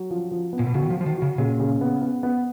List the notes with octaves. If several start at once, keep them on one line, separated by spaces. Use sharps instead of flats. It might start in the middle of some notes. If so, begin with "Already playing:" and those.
Already playing: F#3
F3
F3
B3
A#2
B2
C#3 F#4
D#3
F3
F#4
F3
D#3
C#3 F#4
A#2 C#3
C#3
B3
B3
B3